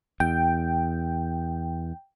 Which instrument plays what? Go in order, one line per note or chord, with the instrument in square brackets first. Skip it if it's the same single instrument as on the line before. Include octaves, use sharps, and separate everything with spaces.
[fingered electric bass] E2 [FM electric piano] G5